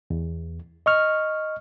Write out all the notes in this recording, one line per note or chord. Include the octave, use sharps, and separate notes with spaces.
E2
D#5 C#6 F6